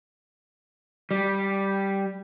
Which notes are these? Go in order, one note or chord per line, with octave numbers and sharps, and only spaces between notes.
G3